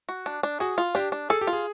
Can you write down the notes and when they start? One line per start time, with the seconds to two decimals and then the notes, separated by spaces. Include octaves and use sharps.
0.09 F#4
0.26 D4
0.43 D4
0.60 F#4 G#4
0.78 F4
0.95 D4 G4
1.12 D4
1.30 G#4 A4
1.41 G4
1.47 F4
1.53 G#4